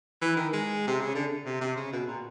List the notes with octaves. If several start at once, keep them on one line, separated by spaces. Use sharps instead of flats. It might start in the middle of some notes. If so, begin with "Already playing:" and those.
E3
D#3
G#3
C3
C#3
D3
C3
C3
C#3
B2
A#2